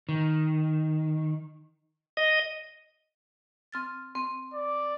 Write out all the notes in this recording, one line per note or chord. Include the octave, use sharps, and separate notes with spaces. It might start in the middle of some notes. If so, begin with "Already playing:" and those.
D#3
D#5
C4 F6 A6
C4
D5